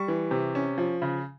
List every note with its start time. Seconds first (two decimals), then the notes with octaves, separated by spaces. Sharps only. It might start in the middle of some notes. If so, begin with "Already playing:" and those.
Already playing: G3 C#6
0.08 E3
0.31 C3
0.55 C#4
0.78 F3
1.02 C#3